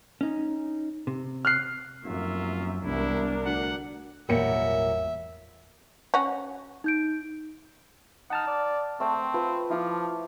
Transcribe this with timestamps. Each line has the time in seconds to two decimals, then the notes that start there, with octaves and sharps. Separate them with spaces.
0.21 C#4 D#4
1.07 C3
1.45 F6 F#6 C7
2.04 F1 F#2 A#3 F4 E5
2.84 E1 C2 D4 E4 A#4
3.45 D2 F#5
4.29 G#1 E2 A#2 F#3 G3 A#3 E5 C#7
6.14 C#4 F#4
6.84 D#4 G6 D7
8.30 D#4 F#5 A5 F6
8.47 D5
9.00 A3 C4 C5 G5
9.34 F4 B4
9.70 F3 E4 F5 D6